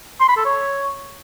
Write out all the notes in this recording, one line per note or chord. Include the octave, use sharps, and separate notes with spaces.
C6
B5
A4
C#5